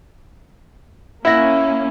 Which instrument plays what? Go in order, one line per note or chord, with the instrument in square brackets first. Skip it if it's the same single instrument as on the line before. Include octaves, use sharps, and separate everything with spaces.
[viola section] A#3 C#4 [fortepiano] E4 [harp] E5 F#5 A#6